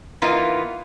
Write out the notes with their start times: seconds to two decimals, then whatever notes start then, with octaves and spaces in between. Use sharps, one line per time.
0.22 E3 A#3 B3 D#4 F4